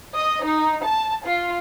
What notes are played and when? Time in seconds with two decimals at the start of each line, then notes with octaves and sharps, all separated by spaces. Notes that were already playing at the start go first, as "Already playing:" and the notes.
0.15 D#5
0.44 D#4
0.85 A5
1.24 F4